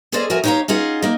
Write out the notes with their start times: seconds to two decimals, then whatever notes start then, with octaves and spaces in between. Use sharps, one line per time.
0.12 C#4 G#4 A4 C5 D5 D#5
0.30 F3 F#4 A#4 E5 G#5
0.44 D#4 G4 C#5 E5 F5 A#5
0.68 C#4 D#4 F4 G#4 F#5
1.02 A#3 D#4 D#5